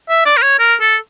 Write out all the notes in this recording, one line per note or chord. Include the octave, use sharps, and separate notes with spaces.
E5
D5
A#4
C#5
A#4
A4